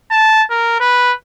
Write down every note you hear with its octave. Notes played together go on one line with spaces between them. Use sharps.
A5
A#4
B4